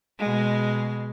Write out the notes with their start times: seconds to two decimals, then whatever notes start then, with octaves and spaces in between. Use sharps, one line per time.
0.19 B2 G#3